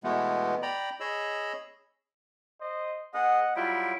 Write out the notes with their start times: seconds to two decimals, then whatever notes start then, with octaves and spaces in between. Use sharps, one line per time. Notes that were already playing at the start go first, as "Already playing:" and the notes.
0.04 B2 E3 G#3 A3 B3
0.62 D5 G5 A#5 B5
1.00 G#4 C#5 D#5 B5 E6
2.61 C5 D#5
3.14 B3 G#4 D#5 F#5
3.56 F#3 G3 E4 F4 G5